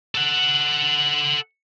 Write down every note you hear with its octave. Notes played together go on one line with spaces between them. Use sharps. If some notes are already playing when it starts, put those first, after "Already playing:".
A4 F#5